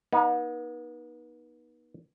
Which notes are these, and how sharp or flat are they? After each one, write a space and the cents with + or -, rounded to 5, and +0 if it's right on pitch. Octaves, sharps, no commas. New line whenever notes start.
B3 -40 D#4 +5